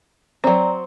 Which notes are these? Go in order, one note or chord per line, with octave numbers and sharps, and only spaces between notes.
F#3 C4 D5 G5 A#5